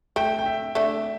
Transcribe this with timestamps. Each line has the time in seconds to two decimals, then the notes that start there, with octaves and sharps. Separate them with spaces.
0.16 A3 G5
0.39 G5
0.46 E5
0.75 A3 D4 E5